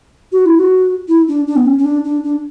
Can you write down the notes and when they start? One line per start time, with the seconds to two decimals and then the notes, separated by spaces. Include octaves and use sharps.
0.32 F#4
0.46 E4
0.59 F#4
1.08 E4
1.28 D4
1.47 D4
1.56 B3
1.66 C#4
1.79 C#4
1.85 D4
2.05 D4
2.24 D4